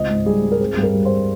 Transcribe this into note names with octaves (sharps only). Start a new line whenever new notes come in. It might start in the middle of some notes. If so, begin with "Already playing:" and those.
Already playing: C#2 C4 D#5
G#2
G3 G#4
G#2
A#4
C4 G#4
G2
A#4
G3
C5